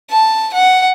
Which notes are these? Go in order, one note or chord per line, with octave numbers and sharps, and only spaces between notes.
A5
F#5